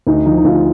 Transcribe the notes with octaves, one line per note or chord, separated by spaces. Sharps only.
D2 D#4
F3 D#4
D#4
D2 F4